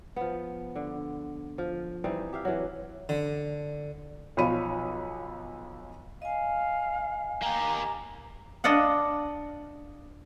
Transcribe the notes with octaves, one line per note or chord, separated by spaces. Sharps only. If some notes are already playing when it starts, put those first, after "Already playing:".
F3 B3
D3
F3
E3 G3 C4 D#4
G4 E5 F5
E3 F#3
D3
B1 F3 C#5 B5 D#7
D#5 F5 G#5
A#3 G4 A#5
D4 D5 D#5 F5 F#5